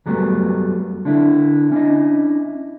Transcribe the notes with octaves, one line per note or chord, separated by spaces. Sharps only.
F#2 F#3 G3 A3 B3
D3 D4 E4
C#4 D4 E4 D#5